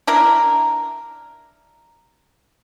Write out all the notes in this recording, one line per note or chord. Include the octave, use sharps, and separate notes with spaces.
D4 E4 A#4